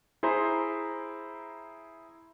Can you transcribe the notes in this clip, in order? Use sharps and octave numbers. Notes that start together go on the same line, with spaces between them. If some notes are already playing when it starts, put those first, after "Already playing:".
E4 G#4 C5 A#5 C6